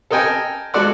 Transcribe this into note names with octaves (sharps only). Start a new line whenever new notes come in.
A4 A#4 D#5 G5 G#5 A#5
G#3 F#4 A4 D5 F#5